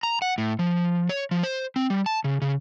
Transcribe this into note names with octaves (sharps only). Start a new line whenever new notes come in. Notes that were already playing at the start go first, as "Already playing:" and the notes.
A#5
F#5
A2
F3
C#5
F3
C5
C4
G3
A5
C#3
C#3